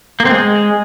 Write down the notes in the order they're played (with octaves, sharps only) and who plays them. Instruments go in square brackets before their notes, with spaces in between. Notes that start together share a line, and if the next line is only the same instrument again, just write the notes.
[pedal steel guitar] A#3
C4
G#3